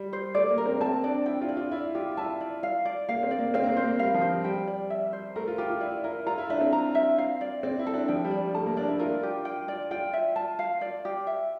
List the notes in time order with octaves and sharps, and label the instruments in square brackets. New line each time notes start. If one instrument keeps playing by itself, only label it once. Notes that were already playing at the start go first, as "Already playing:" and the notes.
Already playing: [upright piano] G3
[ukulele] C5
[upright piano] A3 [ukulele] D5
[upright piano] A#3
[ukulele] A#4
[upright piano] C4
[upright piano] C4 [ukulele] A5
[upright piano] D4 [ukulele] D5
[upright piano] E4 [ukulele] G5
[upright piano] F4
[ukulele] D5
[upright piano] F4
[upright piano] E4 [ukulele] D5
[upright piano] F4 [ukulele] G4
[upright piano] E4 [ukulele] A5
[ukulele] D5
F5
D5
[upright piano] A#3 [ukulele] F5
[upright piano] C4
[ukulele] D5
[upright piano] A#3
[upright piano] C4 [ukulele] F5
[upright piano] A#3
C4
[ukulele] C5
[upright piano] A#3
[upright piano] G3 [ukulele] F5
[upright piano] F3
[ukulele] C5
[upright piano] F3
[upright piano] G3 [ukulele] G5
[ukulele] D5
E5
C5
[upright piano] A3 [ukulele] A#4
[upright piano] F4
[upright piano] F4 [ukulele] G4
[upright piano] F4
[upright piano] E4 [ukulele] D5
[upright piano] E4 [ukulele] A#4
[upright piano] F4 [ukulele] A#5
[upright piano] E4
[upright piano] D4 [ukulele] E5
[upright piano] C4
[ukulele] A#5
E5
F5
D5
[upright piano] C4 [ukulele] D5
[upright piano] E4
[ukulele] A4
[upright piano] D4
[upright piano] F3 [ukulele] G5
[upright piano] G3
[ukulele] D5
[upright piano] G3
[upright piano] A3 [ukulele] A5
[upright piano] A#3
[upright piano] D4 [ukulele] D5
[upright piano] E4
[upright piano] F4 [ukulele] A#4
[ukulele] G4
G5
D5
[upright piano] F4 [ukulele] G5
[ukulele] E5
A5
F5
D5
G4
E5